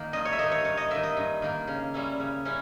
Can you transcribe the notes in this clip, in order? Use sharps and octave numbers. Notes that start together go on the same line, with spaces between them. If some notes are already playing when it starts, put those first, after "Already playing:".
Already playing: D#3 A#3
G2 D#5
C#5
E5
D#3 A#3 D#5
C#5
G2 C#5
D#5
D#3 A#3 E5
D#5
G2
D#3 A#3
C#3
G3 C#4 E4
C#3
G3 C#4 E4